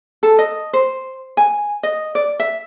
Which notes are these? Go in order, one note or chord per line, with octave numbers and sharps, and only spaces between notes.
A4
D#5
C5
G#5
D#5
D5
E5